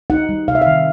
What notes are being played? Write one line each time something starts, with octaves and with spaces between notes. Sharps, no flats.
D#4 F#5
G3
C3 F5
E5
F5
D#3